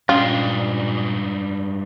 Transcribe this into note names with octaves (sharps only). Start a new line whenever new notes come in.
G2 A#2 G#3 C#4 F4